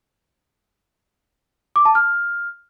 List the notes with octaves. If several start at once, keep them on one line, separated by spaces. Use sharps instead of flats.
D6
A5
F6